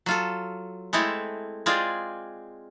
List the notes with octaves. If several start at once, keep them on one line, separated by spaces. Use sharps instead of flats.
F#3 F4 A4
G#3 A3 C4 E4 A4
G#3 C4 F4 G#4 D5